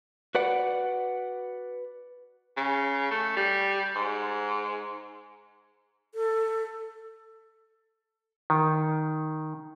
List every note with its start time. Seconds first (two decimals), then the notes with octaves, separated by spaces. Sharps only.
0.35 F#4 B4 D5 F#5
2.57 C#3
3.11 A3
3.37 G3
3.95 G#2
6.15 A4
8.50 D#3